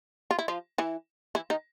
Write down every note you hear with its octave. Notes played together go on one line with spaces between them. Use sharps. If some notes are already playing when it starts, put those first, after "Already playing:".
F4
E4
F3 F4
E3 E4
E3 E4
D#3 D#4